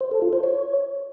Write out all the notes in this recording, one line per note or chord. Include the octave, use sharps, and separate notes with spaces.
C5
A4
F4
C5
C#5